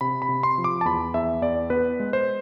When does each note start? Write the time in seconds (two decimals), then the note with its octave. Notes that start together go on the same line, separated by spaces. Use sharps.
0.01 C3 B5
0.22 B5
0.29 C3
0.43 C6
0.58 F3
0.64 D6
0.81 A5
0.85 E2 B5
1.14 E2 E5
1.42 E2 D5
1.70 B3 B4
2.00 G#3
2.13 C5